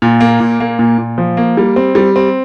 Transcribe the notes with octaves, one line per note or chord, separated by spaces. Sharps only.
A#2
A#3
A#2
A#3
A#2
A#2
F3
A#3
G3
C4
G3
C4